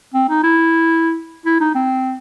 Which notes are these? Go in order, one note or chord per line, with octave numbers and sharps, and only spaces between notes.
C4
D#4
E4
E4
D#4
C4